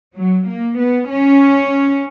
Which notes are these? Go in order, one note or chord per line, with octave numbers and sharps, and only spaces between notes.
F#3
A#3
B3
C#4